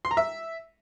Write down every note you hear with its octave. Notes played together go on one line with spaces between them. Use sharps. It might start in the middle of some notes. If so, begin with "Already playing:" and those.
C6
A#5
E5